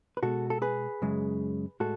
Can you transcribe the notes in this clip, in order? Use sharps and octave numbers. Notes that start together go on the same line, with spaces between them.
B4
B2 G#3 F#4 A4
A4
G#4 B4
F#2 C#3 G#3
A2 G#3 F#4 A4